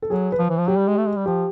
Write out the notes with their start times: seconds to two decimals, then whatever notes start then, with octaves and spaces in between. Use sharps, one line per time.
0.02 A4
0.10 F#3 G#4
0.32 B4
0.39 F3 C5
0.50 E3
0.59 F3
0.68 F#3 G4
0.78 G3
0.88 G#3
0.97 A3
1.06 G#3
1.16 G3
1.26 F3 G4